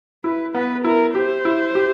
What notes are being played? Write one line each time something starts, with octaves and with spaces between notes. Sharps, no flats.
E4 B4
B3 B4
E4 A#4
G4 C5
E4
G4